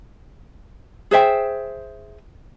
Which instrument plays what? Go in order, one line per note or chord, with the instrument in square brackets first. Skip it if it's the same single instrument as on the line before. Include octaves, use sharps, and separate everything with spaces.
[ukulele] G#4 C5 E5 G5